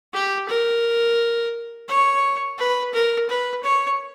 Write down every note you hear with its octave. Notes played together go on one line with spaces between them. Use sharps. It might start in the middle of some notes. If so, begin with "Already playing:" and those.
G4
A#4
C#5
B4
A#4
B4
C#5